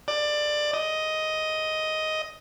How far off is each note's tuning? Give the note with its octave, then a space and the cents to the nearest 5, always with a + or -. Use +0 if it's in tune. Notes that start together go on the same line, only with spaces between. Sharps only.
D5 +20
D#5 +10